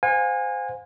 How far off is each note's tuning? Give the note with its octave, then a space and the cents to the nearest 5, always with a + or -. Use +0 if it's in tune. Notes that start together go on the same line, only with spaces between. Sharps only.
C5 -20 F5 +45 G#5 -20